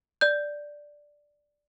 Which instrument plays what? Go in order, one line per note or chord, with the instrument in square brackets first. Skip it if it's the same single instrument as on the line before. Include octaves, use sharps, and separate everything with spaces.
[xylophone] D5 G6